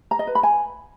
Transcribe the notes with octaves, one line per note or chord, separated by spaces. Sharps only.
A#5
D#5
B4
B5
G#5